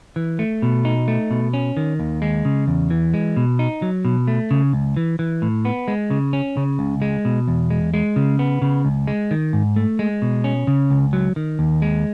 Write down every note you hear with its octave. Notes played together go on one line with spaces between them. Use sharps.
E3
A3
B2
D#4
A3
B2
C#4
D#3
D#2
G#3
C#3
E2
E3
G#3
B2
D#4
F#3
B2
A3
C#3
C#2
E3
E3
A2
B3
G#3
C#3
C#4
C#3
C#2
G#3
B2
E2
G#3
G#3
C#3
B3
C#3
C#2
G#3
D#3
G#2
A3
G#3
B2
C#4
C#3
C#2
F#3
D#3
D#2
G#3